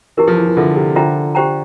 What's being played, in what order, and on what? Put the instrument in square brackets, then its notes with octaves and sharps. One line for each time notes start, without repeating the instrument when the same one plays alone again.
[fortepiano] E3 [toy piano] E4 G4 A#4
[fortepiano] F3
E3
E3
[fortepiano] D3 [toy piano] F4 A4 E5
[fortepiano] C3
[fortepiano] D3 [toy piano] F4 C5 E5 G5 A#5
[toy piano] G4 C5 G5 A#5